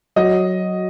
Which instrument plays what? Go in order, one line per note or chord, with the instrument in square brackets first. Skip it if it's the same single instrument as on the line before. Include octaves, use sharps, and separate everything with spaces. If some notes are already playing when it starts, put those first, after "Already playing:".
[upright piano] F#3 [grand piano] D#5